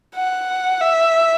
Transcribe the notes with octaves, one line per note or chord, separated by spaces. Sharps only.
F#5
E5